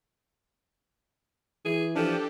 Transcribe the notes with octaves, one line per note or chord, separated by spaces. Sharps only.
E3 G#4
F3 D4 G4 A4